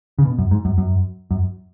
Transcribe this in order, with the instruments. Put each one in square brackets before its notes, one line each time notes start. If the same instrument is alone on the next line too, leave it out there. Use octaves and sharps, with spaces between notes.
[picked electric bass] C#3
B2
F#2
G#2
F#2
F#2
F#2